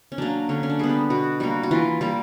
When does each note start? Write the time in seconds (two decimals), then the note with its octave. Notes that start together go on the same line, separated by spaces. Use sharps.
0.12 C#4
0.18 F#3 A#3 D4
0.49 D3 C#4
0.63 C#4
0.70 D4
0.79 G3 B3 G#4
0.89 G4
1.10 B2 F#4
1.40 G3 A#3 F#4
1.63 F#4
1.71 E3 F4
2.01 G3 A#3